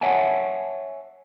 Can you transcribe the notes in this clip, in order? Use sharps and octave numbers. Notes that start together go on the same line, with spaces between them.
C#5 E5 F#5 G#5 A5